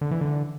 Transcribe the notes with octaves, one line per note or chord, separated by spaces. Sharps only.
D3
E3
D3